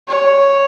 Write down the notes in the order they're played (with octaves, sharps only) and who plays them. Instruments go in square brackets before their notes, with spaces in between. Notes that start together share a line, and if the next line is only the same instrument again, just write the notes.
[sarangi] C#5